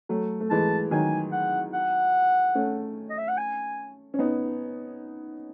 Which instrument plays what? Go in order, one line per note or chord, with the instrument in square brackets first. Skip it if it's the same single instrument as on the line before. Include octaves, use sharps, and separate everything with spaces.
[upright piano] F#3 A3
A3
[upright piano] E3 G#3 [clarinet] A5
[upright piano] D#3 F#3 [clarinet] G#5
[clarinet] F#5
F#5
[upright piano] A3 C#4
[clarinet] D#5
E5
F#5
G#5
[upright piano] C#4
B3 D#4